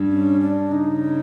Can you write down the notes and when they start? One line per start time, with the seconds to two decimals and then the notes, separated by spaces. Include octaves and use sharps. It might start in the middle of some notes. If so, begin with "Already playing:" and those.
Already playing: G2
0.09 C#4
0.40 D4
0.72 C#3 D#4